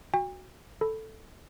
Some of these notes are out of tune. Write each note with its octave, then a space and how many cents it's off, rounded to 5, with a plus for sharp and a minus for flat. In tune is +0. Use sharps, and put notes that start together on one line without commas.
F#4 +0 G5 +45
A4 +0 B5 +0